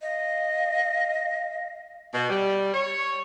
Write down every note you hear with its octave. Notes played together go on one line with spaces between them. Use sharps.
D#5 F5
B2
G3
C#5